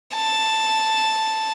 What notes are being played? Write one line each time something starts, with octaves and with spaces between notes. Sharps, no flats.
A5